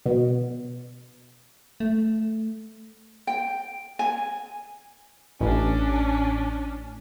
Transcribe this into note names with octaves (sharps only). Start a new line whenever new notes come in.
B2
A3
G5
G#5
A1 C#4 D4